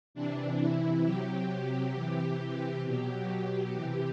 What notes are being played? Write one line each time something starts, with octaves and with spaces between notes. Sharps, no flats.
C3 E3 D4
E4
C3 F#3 G4
C3 E3
B2 F#3 G4
C3 E3